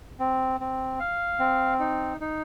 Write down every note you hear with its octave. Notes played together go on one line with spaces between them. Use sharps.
C4
C4
F5
C4
D#4
D#4